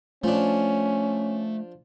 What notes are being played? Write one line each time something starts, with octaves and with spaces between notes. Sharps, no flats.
F3 A3 C#4 D4